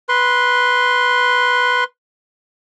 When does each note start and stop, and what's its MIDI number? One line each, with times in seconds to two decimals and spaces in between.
0.09 1.84 71
0.09 1.84 84